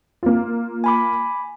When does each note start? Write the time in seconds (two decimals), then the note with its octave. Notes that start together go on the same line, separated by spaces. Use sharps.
0.23 A#3 F4
0.84 G#5 B5 D6